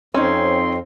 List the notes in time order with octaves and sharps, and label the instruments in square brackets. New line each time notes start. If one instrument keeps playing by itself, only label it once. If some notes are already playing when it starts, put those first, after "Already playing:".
[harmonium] F2 [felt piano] C4 D#4 C#5 [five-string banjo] C#4 [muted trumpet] C6